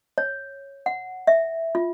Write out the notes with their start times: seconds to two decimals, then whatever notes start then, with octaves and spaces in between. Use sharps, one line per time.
0.18 C#5
0.86 F#5
1.27 E5
1.75 F4